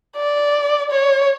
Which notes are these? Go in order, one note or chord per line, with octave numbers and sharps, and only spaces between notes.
D5
C#5